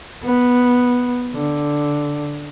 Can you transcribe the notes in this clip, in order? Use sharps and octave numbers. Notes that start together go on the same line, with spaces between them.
B3
D3